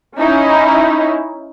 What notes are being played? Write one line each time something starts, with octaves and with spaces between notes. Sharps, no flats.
C#4 D#4 E4